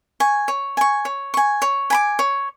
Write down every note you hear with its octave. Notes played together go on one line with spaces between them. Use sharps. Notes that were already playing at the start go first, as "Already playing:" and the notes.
G#5 C#6
C#5
G#5 C#6
C#5
G#5 C#6
C#5
G#5 B5 D6
C#5